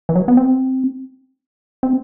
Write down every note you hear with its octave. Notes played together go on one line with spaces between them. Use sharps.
E3
F#3
B3
C4
C4